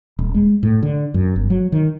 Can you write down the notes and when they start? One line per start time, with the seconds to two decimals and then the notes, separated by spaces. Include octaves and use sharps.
0.19 D#1
0.34 G#3
0.63 A2
0.83 D3
1.14 F#2
1.36 G1
1.50 F#3
1.72 D#3